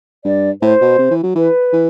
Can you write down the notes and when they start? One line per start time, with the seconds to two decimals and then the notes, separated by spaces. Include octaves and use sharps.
0.25 G2 D5
0.62 A2 C5
0.81 B2
0.98 C3
1.11 E3
1.23 F#3
1.36 E3 B4
1.73 E3